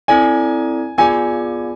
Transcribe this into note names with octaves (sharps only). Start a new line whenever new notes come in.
C4 E4 A4 D5 G#5
B3 F4 G#4 D5 G#5